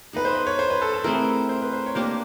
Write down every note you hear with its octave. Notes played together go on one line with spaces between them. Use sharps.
B3 D#4 G#4 B4
C5
B4
C#5
C5
B4
A4
A4
A3 C4 E4 G#4 A#4
C5
B4
C5
C#5
A#3 D4 G4 A#4 C5